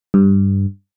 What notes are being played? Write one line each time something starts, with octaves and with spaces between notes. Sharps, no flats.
G2